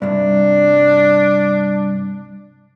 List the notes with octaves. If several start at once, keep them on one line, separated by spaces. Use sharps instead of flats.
C2 G2 D4